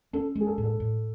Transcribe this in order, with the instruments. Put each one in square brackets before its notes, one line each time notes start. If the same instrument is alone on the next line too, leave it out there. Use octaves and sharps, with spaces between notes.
[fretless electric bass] C#4 [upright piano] A4
[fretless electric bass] G#3
[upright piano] G#4
A4
[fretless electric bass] A2
[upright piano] A4
[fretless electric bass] A2